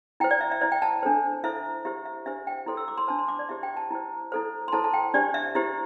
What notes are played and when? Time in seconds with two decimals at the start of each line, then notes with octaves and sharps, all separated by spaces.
0.20 E4 C5 G5
0.31 D5
0.41 E5
0.52 E5
0.61 E4 C5 D5
0.72 G5
0.82 A5
1.03 D4 A4 C5
1.44 E4 A4 C5 E5
1.85 E4 G4 C5 E5
2.05 E5
2.26 D4 G4 C5 E5
2.47 G5
2.66 E4 A4 C5 C6
2.77 E6
2.88 D6
2.98 C6
3.08 D4 C5 A5
3.19 C6
3.28 D6
3.39 D5
3.49 E4 G4 C5 E5
3.63 G5
3.77 A5
3.91 E4 C5
4.32 E4 A4 C5
4.68 C6
4.72 E4 A4 C5 A5
4.84 A5
4.94 G5
5.14 D4 G4 C5 D5
5.34 E5
5.55 E4 G4 C5